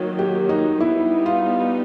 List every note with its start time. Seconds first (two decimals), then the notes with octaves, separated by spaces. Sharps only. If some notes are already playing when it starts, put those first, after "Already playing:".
Already playing: D#3 F#3 A#3
0.19 G4
0.49 D#4
0.80 G3 B3 D#4 E4
1.26 F4